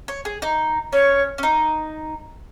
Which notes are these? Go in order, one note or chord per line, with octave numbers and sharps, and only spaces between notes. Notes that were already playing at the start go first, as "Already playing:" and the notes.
C#5
G#4
D#4
C#4 C#5
C#4
D#4